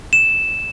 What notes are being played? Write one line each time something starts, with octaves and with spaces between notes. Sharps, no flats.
E7